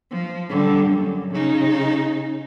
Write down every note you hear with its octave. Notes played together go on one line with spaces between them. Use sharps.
F3
D3 G3
F#2
C#3 D#4